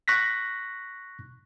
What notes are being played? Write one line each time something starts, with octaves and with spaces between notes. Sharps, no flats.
C#6 F#6 A#6 B6